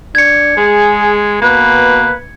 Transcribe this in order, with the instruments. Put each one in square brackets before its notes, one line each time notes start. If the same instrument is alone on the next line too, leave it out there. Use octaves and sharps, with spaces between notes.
[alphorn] D4 [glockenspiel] G#6 C#7
[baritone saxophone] G#3 [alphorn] G#4
[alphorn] B2 [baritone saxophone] A#3 [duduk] B4